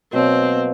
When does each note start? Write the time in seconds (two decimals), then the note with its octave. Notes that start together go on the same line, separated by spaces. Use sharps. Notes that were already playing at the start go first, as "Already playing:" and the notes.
0.13 B2 F#3 A#3 C4